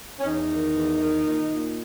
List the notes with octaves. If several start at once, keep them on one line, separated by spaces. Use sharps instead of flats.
C#4
E2 D#4
D#3
E2
D#3
A#2
A#2